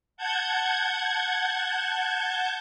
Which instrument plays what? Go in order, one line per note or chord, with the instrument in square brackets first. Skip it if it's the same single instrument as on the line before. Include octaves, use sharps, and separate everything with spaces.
[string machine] F#5 A5 G6 G#6